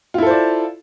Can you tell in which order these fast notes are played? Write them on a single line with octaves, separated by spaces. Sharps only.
F4 E4 A4 C5 D5